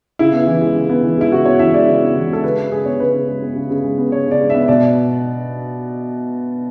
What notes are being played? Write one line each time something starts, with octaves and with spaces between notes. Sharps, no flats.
C#3 E4
B3
E3
G#3
C#3
B3
E3
G#3 E4
C#3 F#4
B3 C#5
E3 E5
G#3 D5
C#3
B3
E3
G#3 A4
C#3 B4
C#3
G#3 G#4
B3 C#5
C#3 B4
C#3
G#3
B3
C#3
C#3
G#3
B3
C#3 C#5
C#3 D5
G#3
B3 E5
B2 D5